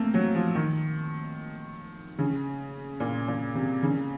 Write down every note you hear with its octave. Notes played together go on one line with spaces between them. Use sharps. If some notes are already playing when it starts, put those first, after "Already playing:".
Already playing: A3 A#3 C4
F#3
F3
D#3
C#3
A#2
A#2
C3
C#3